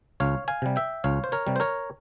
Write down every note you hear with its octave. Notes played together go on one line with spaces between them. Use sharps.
C#2 C#5 F5
F5 G#5
C3 G3
E5 G5
C#2 C#5 F5
C5
A#4 C#5
C3 G3
C5
A#4 C#5